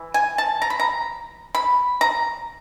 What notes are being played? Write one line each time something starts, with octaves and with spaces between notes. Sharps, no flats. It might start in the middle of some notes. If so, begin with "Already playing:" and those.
Already playing: E3
G#5
A5
A#5
B5
A#5
B5
A#5